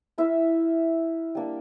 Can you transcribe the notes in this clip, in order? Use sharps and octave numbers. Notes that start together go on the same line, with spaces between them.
E4 A#4 E5
G3 A#3 D4